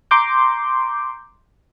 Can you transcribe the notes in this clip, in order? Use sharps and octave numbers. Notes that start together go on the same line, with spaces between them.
A#5 C6 D6 G6